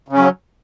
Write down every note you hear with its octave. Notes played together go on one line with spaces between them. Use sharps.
C#3 F#3 C#4